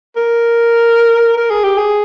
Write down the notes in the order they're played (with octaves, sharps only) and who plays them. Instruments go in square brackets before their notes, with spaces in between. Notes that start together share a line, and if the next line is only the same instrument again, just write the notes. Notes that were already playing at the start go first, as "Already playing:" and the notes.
[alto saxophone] A#4
A#4
G#4
G4
G#4